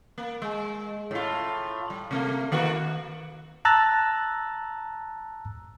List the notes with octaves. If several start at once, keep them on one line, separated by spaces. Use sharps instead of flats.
A#3
G#3
A2 F4
G3
C3 A3 A#3
D#3 A#3 F#4
A5 A#5 E6 F#6 A6